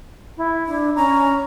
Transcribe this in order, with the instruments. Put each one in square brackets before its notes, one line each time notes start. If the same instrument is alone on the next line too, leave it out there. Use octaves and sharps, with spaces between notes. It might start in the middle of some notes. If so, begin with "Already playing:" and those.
[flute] E4
[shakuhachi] D4
[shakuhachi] C#4 [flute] A#5